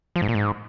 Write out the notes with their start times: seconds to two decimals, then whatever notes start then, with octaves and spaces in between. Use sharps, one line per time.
0.16 F3
0.22 G#2
0.28 A#2
0.35 G#2